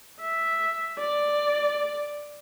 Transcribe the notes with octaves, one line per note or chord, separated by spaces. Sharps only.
E5
D5